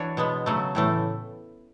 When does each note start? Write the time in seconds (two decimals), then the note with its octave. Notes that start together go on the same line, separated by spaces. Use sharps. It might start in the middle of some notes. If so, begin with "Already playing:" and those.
Already playing: E3 D4 F#4 C#5
0.17 B2 G#3 B3
0.46 C#3 F#3 A3
0.75 A2 E3 A3